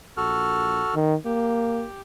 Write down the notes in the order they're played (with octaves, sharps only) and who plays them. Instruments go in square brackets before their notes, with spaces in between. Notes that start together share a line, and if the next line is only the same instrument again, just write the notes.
[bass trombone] A#1 [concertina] F#4 A4 F6
[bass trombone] D#3
[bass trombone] A#3 [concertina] G4